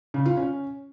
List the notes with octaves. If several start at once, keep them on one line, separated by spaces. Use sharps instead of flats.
C#3
F4
C#4